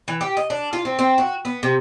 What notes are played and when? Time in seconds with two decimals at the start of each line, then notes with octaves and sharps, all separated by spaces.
0.08 E3
0.21 G4
0.37 D#5
0.50 D4
0.73 F4
0.85 C4
0.99 C4
1.18 F#4
1.45 B3
1.63 C3